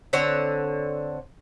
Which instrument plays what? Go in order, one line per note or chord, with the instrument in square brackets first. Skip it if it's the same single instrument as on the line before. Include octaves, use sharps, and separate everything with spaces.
[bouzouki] D3 C4 C#5 F#5